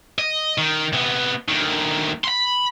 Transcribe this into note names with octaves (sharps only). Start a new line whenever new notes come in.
D#5
D#3
C3 B3
D2 D#3
B5 C6